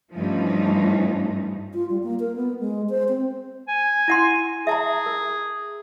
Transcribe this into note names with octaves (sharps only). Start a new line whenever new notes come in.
G2 E3 F3 A3 C#4 D#4
F4
G3
A#3
A#4
B3
G#3
C5
C4
G#5
E4 F#5 C6
G#4 E5 A5 A#5
A#4